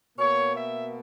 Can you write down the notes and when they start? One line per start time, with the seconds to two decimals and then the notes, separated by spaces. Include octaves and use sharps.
0.18 B2 A#3 C#5
0.55 E5